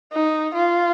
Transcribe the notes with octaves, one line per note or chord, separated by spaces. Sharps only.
D#4
F4